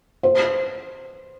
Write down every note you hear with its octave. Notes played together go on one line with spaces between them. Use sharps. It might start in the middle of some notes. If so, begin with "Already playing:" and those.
C5